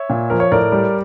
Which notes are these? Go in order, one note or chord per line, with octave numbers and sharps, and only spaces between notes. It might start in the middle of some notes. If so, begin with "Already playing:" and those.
Already playing: C#5 E5
A#2
F3 A#4
C#5
A2 A#4 D5
G3